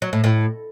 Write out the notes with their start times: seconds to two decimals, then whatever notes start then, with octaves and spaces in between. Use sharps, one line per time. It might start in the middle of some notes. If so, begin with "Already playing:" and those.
0.02 F#3
0.13 A2
0.24 A2